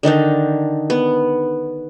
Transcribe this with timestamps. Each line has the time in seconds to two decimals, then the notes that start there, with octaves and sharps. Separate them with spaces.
0.03 D3 D#3 D4 D#4
0.90 B3